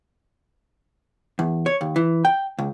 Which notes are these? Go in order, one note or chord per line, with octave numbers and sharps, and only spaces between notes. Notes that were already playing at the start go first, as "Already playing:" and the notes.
E2
C#5
D#2
E3
G5
C#2